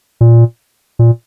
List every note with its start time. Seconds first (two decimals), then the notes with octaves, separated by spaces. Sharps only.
0.21 A#2
0.99 A#2